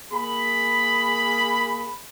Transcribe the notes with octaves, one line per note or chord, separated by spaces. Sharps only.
A#3 G#4 B5